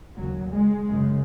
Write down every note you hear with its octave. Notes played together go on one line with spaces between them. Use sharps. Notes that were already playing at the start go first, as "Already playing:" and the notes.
D#2 C#3 F#3
G#3
F#2 C#3